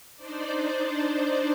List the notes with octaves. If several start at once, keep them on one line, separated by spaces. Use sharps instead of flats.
D4 D#4 C5 D5